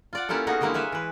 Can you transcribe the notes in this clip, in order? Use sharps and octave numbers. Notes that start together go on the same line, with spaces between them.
F4 D5 F#5
A#3 C#4 E4 F4 G4 A4
A3 B3 C#4 D#4 F#4 G#4
D3 G3 G#3 A#3 E4
B4 C#5 E5 F5 G#5
E3 B4